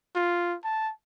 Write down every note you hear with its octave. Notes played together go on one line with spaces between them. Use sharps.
F4
A5